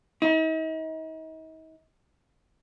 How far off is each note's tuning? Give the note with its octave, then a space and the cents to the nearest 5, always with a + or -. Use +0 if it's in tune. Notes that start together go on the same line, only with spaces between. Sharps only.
D#4 +40